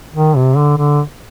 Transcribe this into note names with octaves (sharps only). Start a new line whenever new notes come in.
D#3
C3
D3
D3